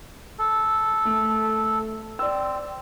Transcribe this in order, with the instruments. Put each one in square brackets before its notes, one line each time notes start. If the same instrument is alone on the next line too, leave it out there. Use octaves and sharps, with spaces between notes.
[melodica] A4
[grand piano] A3
[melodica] C4 [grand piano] D5 E6